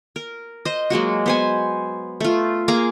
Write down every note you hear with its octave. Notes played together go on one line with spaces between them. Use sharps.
A#4
C5 D#5
F#3 G#3 A#3 F#4
B3 C5 G#5
A3 F4
A#3 G#4 F5 A#5